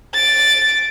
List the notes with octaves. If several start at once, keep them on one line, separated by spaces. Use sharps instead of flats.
A6 D7